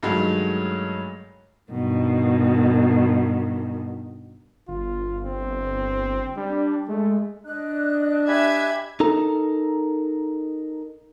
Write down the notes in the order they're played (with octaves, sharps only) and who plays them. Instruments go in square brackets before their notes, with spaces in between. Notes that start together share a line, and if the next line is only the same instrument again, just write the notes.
[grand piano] G2 D#3 F#3 G#3 A3
[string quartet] G2 B2 D#3
[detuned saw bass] G1 [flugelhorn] F4
[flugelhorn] C4
[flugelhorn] G3 [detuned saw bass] D4
[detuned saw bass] G#3 [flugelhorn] A3
[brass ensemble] D4 [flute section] D#5 F#6
[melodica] G4 G#5 B5 [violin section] E5 G#6
[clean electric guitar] D#4 A4 A#4 A#5